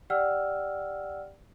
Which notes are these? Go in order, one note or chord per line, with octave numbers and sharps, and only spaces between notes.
G4 D5 F#5 G5 E6 F6